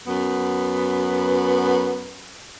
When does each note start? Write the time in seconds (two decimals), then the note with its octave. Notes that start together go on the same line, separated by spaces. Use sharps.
0.06 F#2 B3